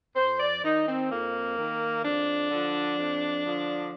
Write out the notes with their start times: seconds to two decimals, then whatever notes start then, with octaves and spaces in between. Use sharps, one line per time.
0.16 F2 C5
0.40 D5
0.63 D#3 D#4
0.87 C4
1.10 F2 A#3
1.57 D#3
2.03 F2 D4
2.50 D3 F3
2.98 F2
3.44 D3 F3